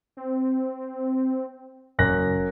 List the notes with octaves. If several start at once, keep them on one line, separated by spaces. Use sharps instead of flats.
C4
F#1 F#2 F#6 A#6